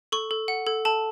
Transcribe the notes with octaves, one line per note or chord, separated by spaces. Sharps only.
A4 C#6
A4
F#5
A4
A4 A5